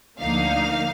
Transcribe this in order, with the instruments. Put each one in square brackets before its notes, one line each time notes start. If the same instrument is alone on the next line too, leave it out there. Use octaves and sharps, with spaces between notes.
[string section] D2 D3 F3 A#3 D#4 F5